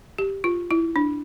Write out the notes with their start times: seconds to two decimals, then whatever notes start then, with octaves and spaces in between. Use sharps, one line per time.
0.18 G4
0.44 F4
0.71 E4
0.96 D4